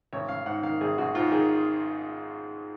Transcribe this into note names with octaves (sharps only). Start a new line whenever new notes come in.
G#1 C#5
G#1 F5
G#2 F#5
D#3 F5
G#1 G#4
G#1 F#4
G#2 F4
D#3 G#4